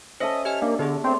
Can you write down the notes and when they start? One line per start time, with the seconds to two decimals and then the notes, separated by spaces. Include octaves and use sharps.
0.20 C#4 A4 C5 D#5 E5 A5
0.45 G4 D#5 G#5 F6
0.62 A#3 D4
0.79 D3 B3 G4 G#4
1.04 A3 C4 C#5 C6